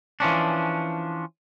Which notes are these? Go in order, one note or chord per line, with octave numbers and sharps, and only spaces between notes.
E3 F3 C#4 D4